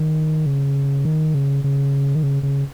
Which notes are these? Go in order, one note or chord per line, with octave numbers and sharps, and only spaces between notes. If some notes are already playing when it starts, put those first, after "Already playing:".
Already playing: D#3
C#3
D#3
C#3
C#3
D#3
C#3
C#3